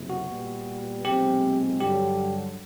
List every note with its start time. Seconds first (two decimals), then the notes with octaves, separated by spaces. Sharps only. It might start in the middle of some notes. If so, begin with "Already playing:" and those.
Already playing: F#1 F2 C3
0.10 F#4
0.28 A#2 G3 B3
1.04 B1 A#2 F3 G#3 C4 G4
1.80 G2 D3 F#3 G4